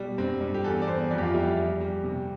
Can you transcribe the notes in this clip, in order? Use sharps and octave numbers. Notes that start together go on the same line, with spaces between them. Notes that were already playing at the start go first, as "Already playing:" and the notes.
Already playing: B2 G3
G2 C4
G2
G4
E2 A4
D5
E2 C5
F2 D5
G4
F4
G3 E4
G3
G3
C3